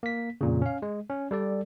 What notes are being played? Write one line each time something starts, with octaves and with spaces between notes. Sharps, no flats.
A#3 B6
F2 A#2 C#3
C#4 F5
G#3
C#4
G3 A4 D5